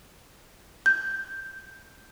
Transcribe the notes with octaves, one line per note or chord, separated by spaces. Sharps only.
G6